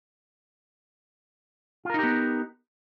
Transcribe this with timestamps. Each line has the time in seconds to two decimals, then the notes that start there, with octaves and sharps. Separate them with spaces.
1.85 F4
1.90 A#4
1.94 D#4
1.99 G4
2.03 B3